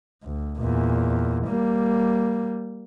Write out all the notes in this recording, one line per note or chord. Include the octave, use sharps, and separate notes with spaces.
D2
E2 A#2
G3 A#3